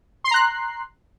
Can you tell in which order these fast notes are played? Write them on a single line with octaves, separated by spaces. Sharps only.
C6 C7 A#5 F#6